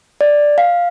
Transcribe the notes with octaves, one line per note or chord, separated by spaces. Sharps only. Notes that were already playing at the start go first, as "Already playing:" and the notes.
D5
F5